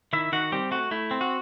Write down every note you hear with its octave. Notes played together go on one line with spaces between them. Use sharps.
D#3 E4 E5
D#3 F#4 F#5
G3 C4 G4
A3 F#4
A3 E4
C4
F#4